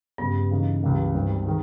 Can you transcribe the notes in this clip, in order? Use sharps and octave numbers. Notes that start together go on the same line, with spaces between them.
G2 C#3 G3 B3 G4 B4
C#3 E3 A#3 D#4
C#2 C#3 E3 G3 A#3
G#1 G2 G3
D#3 G#3